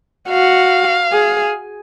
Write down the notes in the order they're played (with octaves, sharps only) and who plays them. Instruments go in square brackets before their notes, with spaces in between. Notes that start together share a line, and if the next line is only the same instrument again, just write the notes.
[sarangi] F#4 [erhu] F5
[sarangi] G#4